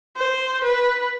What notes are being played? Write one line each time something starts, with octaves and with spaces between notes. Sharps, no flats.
C5
B4